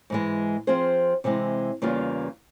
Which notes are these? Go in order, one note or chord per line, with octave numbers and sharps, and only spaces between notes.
G#2 E3 G#3
F3 C4 F4 G#4 C5
C3 E3 G#3 C4
E2 C#3 G3 A#3 F4